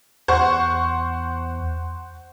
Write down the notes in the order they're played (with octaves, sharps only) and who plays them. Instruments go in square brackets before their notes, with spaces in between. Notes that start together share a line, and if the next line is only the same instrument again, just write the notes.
[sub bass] E2 [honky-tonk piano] C5 F#5 C#6